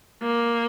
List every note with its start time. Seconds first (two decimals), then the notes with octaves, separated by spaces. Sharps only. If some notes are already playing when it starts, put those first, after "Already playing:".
0.22 A#3